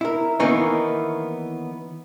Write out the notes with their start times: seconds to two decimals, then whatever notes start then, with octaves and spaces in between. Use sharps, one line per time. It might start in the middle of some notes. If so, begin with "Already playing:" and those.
0.01 E4 A#4
0.39 D#3 E3 A#3 B3 C#4 D#4